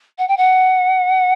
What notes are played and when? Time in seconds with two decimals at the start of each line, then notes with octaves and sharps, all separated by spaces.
0.18 F#5
0.28 G5
0.37 F#5